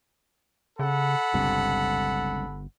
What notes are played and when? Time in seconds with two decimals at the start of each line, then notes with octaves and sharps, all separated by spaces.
0.79 C#3 A4 F#5 B5
1.34 G1 C#2 G2 C3